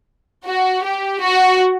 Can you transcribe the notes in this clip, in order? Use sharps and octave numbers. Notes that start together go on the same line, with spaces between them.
F#4
G4
F#4